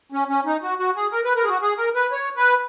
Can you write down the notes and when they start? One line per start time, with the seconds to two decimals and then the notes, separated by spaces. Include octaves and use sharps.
0.12 C#4
0.29 C#4
0.45 D#4
0.63 F#4
0.79 F#4
0.96 G#4
1.12 A#4
1.25 B4
1.36 A#4
1.44 G#4
1.49 F#4
1.62 G#4
1.78 A#4
1.95 B4
2.12 C#5
2.37 B4